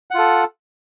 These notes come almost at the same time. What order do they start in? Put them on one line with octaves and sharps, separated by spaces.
F#5 F4 A4